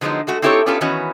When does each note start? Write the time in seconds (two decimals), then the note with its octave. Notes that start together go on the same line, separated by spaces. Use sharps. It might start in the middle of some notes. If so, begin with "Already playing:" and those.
0.01 D3 F3 F#3 G#3 B3 D#4
0.27 G#3 A3 F#4
0.42 C4 D#4 E4 G4 A4 C#5
0.66 B3 C#4 D4 F4 G4 A4
0.81 D#3 E3 B3 C#4 F#4